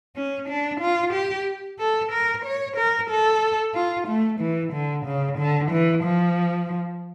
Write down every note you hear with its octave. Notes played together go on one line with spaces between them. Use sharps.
C#4
D4
F4
G4
A4
A#4
C#5
A#4
A4
F4
A3
E3
D3
C#3
D3
E3
F3